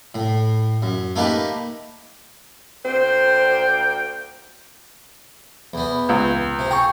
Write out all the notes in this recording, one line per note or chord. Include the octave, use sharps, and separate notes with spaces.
A2
F#2
A3 A#3 D#4 G4 B4
D2 A#3 C5 G5
E2 B3
C#2
C3
G#4 G5 C#6